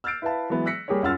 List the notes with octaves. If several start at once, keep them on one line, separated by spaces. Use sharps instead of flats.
E6 F6 G6 A6 C7 D7
E4 B4 E5 F5 A5
E3 F#3 G#3 B3
E6 F#6 A#6 B6 C#7
G3 A#3 G4 G#4 A#4 C#5
F#2 F4 F#5 E6 F6 A6